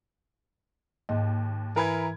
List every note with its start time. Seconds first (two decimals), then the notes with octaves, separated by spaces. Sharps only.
1.09 D#2 G#2 D#5
1.76 E3 A#4 B5 G#6